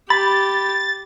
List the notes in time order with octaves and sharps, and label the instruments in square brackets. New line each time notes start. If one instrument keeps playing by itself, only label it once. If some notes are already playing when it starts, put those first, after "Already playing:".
[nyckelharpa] G4 [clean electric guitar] B5 [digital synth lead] A6